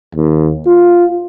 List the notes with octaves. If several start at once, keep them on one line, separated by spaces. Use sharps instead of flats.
D#2
F4